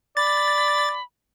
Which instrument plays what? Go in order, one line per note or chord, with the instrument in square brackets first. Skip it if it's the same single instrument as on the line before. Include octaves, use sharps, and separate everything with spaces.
[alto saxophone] D5 [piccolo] B5 [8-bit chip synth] A6